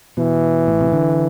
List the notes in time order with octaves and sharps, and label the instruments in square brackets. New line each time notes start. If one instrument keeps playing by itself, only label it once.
[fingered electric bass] B2 [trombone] E3
[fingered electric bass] A2
C3
D3